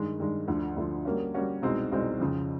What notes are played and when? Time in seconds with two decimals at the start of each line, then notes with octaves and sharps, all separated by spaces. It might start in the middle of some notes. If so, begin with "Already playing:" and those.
Already playing: G2 D#3 G#3
0.19 G2 D#3 G#3
0.47 D2 D3 F3
0.76 D2 D3 F3
1.05 G3 A#3 C#4 F#4
1.34 G3 A#3 C#4 F#4
1.62 C2 B2 G#3 C4 D#4
1.92 C2 B2 G#3 C4 D#4
2.20 F2 C#3 F3